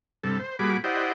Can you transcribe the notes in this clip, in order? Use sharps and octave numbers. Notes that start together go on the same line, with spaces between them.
G2 C3 A4
C5
A#2 G3 F#4 G#4 B5 D6
E4 G4 C5 D5 D#5 F#5